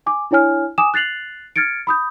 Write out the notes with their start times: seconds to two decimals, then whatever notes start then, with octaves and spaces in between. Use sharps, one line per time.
0.06 G#5 D6
0.31 D4 E4 C#5 G#5 F6
0.78 G#5 D6 D#6 E7
0.94 F#6 A6 C7 F7 F#7
1.56 F6 G#6 A6 C#7 D7
1.87 B5 D#6 G6